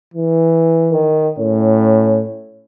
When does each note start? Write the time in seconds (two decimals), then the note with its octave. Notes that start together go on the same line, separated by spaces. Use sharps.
0.14 E3
0.92 D#3
1.39 A2 C#4